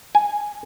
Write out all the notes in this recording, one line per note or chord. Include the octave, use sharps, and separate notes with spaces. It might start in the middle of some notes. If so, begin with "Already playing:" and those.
G#5